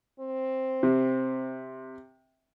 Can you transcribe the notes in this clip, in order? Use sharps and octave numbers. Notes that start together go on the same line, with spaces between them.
C4
C3